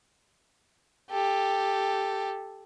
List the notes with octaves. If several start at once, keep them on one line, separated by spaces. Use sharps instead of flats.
G4 A4